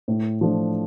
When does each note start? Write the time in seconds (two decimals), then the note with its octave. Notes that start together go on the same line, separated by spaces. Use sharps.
0.08 A2
0.41 F3 A3 D4